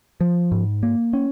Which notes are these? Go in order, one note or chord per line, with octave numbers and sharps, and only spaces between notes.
F3
G#2
A#3
C#4